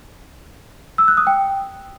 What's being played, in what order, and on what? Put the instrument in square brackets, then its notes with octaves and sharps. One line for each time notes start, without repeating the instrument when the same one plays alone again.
[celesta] E6
F#6
D#6
G5